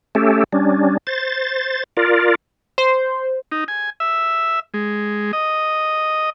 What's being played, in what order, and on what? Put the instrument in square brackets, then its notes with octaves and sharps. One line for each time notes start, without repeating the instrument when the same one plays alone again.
[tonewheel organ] A3 C#4 G4 A4
G3 C#4 D4
C5 A6
F4 A#4 D5
[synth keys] C5
[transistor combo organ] D#4
G#5
E5
G#3
D#5